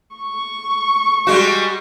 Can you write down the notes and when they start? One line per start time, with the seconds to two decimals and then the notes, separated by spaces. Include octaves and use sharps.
0.16 C#6
1.27 G3 G#3 F#4